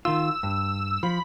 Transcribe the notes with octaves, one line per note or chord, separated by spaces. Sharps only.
D#3 F4 E6
G2
F3 B5